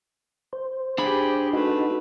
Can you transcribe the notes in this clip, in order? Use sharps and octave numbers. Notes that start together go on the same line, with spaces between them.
C5
D4 G4 G#4 B5
A3 D#4 F#4 B4